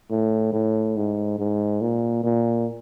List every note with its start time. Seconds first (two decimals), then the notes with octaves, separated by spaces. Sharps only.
0.11 A2
0.53 A2
0.97 G#2
1.39 G#2
1.81 A#2
2.24 A#2